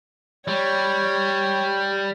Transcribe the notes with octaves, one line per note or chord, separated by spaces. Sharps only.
G3 C#5